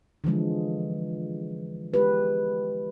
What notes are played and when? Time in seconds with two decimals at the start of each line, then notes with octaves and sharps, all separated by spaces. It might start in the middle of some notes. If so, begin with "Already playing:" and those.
0.24 D3 E3 F3 G#3
1.94 G#3 E4 G4 B4